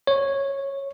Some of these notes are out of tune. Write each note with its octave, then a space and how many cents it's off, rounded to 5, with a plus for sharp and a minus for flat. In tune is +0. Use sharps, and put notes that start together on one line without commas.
C#5 -10